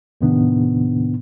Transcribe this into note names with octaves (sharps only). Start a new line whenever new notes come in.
D#2 A2 C3 D#3 B3 D4